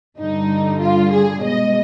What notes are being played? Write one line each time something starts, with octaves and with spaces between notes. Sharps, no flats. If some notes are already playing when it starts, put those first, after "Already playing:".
G2 D3 G3 D#4
F4
G#4
B2 G#3 D#5